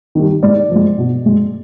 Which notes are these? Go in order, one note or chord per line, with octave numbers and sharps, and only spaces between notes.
D#3 G3
G#2 D5
F3
G#3
B2
G#3